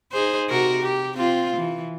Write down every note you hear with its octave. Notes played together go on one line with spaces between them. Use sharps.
D#4 G#4 C5
C3 F#4 A#4
G4
C4 F4
E3